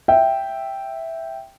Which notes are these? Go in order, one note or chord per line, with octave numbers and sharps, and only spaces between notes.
E5 G5